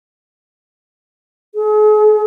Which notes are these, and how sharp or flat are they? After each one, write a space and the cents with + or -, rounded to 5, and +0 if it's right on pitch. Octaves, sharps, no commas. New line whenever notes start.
G#4 +40